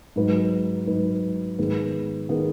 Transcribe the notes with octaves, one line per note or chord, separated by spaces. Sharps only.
G#2 F#3 D#4 B4
G#2 F#3 D#4 B4
G#2 D#3 B3 G#4 B4
D#3 B3 G#4 B4